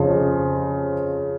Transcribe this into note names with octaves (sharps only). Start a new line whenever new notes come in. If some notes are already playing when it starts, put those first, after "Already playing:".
Already playing: F2 C#3 F3